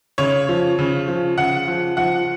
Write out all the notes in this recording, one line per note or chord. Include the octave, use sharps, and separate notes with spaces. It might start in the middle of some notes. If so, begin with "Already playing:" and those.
C#3 C#5
F3
C#3
F3
C#3 F#5
F3
F3 F#5